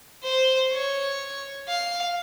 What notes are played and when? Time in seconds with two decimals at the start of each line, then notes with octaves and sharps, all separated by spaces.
0.23 C5
0.72 C#5
1.68 F5